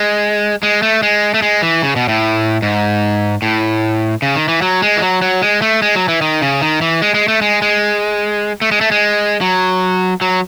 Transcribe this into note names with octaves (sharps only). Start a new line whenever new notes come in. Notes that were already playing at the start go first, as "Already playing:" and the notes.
Already playing: G#3
G#3
A3
G#3
A3
G#3
E3
C#3
B2
A2
G#2
A2
C#3
D#3
E3
F#3
G#3
E3
F#3
F#3
G#3
A3
G#3
F#3
E3
D#3
C#3
D#3
E3
G#3
G#3
A3
G#3
G#3
A3
G#3
A3
G#3
F#3
F#3